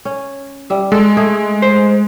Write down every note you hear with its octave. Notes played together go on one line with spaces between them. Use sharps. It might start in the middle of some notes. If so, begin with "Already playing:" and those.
C#4
G3 E5
G#3 A4
A3 G#4
C5